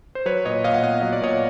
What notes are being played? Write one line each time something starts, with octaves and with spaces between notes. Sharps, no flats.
C5
F#3 B4 C#5
A#2 C#5 D#5
A#2 D#5 F5
F#5
B3 D#5 F5
F#3 D#5
D5
A#2 C#5 D#5